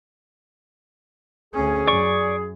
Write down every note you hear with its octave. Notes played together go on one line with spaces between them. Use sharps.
D2 C#4 G#4
F#2 D5 C#6